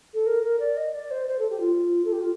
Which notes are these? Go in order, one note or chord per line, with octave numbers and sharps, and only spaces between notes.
A4
A#4
A#4
D5
D#5
D5
C5
C5
A4
G4
F4
A4
G4
F4